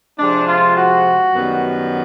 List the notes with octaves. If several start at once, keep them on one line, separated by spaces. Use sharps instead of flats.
C3 F3 G#3 D4
F4
F#4
F#2 D#3 G3 B3